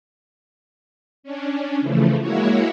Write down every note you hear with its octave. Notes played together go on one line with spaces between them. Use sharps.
C#4 D4
C#3 E3 F3 A3
G#3 A#3 E4 F#4 C#5